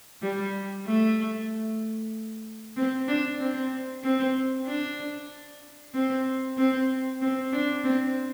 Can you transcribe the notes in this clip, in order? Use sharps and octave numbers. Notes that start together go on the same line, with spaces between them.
G3
A3
C4
D4
C4
C4
D4
C4
C4
C4
D4
C4